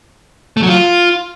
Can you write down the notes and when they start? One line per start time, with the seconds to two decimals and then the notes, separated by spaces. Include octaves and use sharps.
0.57 A3
0.63 F#3
0.69 F4